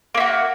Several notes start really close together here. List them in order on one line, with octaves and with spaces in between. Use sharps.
A#3 E4 F#4